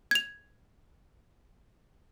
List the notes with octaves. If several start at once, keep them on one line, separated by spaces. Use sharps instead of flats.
G#6 F7